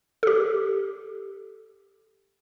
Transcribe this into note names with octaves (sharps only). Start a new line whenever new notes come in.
G4 A4